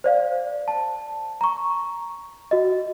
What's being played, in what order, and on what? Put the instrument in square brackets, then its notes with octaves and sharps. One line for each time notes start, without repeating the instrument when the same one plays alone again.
[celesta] C5 D5 F5
A5
A#5 C#6
F#4 D#5